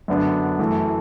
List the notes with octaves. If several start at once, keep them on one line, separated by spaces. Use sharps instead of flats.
F#2 D3 B3 D4
F#2 E3 A3